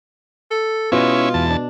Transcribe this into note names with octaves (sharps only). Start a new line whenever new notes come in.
A4
B2 G#3 C#4 E4 F4 D#5
E2 A5
D4